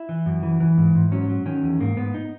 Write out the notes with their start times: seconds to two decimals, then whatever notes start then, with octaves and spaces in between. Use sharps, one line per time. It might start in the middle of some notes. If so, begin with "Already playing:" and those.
Already playing: E4
0.09 E3
0.26 F#2
0.43 E3
0.60 E3
0.77 G#2
0.95 G#2
1.12 F#3 C#4
1.29 F#3
1.46 D#3 C#4
1.63 E2
1.80 G#2 A#3
1.97 G#2 B3
2.14 D#4